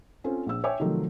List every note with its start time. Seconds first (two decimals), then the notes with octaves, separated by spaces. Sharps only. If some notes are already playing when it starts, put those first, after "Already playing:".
0.24 C4 C#4 F4 A4 C5
0.46 A#1 E6
0.64 C#5 E5 G5 G#5 D6
0.80 C3 D#3 F3 F#3 A3 A4